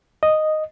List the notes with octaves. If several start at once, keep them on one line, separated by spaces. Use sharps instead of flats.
D#5